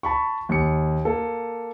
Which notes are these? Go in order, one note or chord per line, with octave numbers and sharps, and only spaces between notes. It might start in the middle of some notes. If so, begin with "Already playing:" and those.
A5 B5 C#6
D#2 C#7
A#3 A4